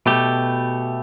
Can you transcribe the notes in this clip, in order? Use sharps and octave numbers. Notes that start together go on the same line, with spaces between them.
B2 A3 G4